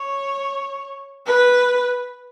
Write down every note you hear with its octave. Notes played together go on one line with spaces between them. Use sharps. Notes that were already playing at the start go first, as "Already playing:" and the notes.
Already playing: C#5
B4